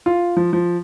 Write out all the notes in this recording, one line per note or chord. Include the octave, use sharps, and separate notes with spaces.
F4
F3
F3